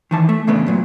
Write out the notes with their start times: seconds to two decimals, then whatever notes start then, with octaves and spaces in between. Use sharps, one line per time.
0.11 D#3 E3 A5
0.29 A3
0.47 E2 C#3 A3 B3 D4
0.67 F#2 A#2 F#3